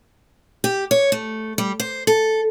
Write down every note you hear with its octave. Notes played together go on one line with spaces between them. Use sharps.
G4
C#5
A3
G3
C5
A4